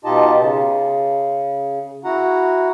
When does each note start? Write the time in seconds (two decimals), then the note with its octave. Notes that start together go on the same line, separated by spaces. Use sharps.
0.05 B2 D#4 F4 G4 D#5 A5
0.39 C#3
2.04 E4 F#4 F#5 A#5